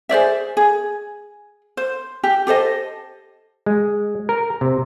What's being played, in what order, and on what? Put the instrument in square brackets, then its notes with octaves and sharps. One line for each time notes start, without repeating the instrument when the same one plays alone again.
[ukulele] G#4 C5 D5 E5
G#4
C5
G4
G4 A4 C5 D#5
[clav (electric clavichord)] G#3
A#4
C3